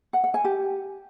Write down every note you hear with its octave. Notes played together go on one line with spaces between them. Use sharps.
F#5
F#5
G#5
G4